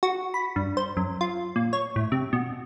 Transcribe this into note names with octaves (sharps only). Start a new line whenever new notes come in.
F#4
B5
G2
C5
F#2
F4
A#2
C#5
A2
C3
B2